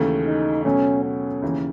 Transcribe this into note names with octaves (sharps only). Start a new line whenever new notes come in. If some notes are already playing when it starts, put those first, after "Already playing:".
Already playing: D#2 C#3 E3 A3
D#4
B2 F#3 A3 C#4
C#4
D#2 C#3 E3